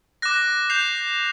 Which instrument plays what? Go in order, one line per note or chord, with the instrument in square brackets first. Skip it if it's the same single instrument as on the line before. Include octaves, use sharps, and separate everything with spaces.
[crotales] D6 F#6 A#6
G6 C7 F7